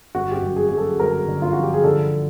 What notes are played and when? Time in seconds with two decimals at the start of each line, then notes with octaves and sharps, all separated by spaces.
0.15 G1 F#4
0.32 G4
0.36 F#4
0.42 F#2
0.56 G#4
0.69 F#2 G#4
0.77 A4
0.99 G1 A#4
1.28 D3
1.42 F4
1.53 F3 F#4
1.63 G4
1.74 G#4
1.83 D3 A4